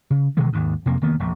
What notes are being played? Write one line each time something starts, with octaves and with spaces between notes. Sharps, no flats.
C#3
B2 D#3 E3 G#3
G#1 D#2 G#2
F2 C3 A#3
F1 D#3 A#3 B3
E1 A#1